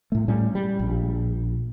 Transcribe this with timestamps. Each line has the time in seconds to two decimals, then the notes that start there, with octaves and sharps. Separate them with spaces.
0.12 A2 A3
0.28 A2 G3 C#4
0.55 G3
0.79 A#1